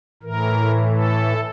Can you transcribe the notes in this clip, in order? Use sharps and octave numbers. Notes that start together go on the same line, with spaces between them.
A2 E3 A#4
A4